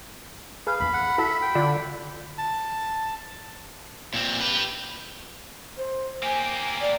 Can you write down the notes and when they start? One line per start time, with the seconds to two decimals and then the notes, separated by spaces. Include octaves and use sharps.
0.67 G#4 B4 F5
0.80 A#1 E2 B5
0.93 F#5
1.18 E4 F#4 A4 E5
1.42 G5
1.55 D3 F4 D5
2.38 A5
4.14 A#2 C4
4.40 G4 B4
5.77 C5
6.23 A#3 G4 G#5
6.81 D5